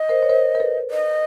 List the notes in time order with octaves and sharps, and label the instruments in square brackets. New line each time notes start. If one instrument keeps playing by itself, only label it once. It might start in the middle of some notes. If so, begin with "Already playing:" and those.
Already playing: [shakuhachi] D#5
[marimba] A#4 C5
C#5
A#4 C5
A#4
A4 B4
[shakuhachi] D#5